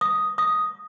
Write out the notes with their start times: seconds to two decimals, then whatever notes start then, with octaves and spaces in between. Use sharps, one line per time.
0.01 D#6
0.38 D#6